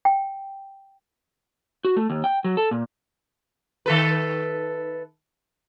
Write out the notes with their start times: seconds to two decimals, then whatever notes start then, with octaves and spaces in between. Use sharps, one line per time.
0.05 G5
1.85 F#4
1.97 A3
2.10 D#2
2.24 G5
2.44 F#3
2.57 A4
2.71 A#2
3.86 D#3 A4 B4